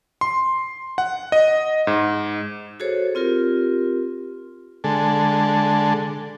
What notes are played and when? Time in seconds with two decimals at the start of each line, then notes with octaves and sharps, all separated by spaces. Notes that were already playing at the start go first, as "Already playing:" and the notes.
0.21 C6
0.98 F#5
1.32 D#5
1.87 G#2
2.80 F#4 G#4 A4 C5 C#5
3.15 C4 F4 G4 A#4
4.84 D3 G#3 A4